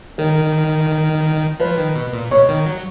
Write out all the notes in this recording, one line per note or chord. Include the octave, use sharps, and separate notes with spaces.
D#3 A#4
F3 B4
D#3
B2
A#2
B2 C#5
D#3
F#3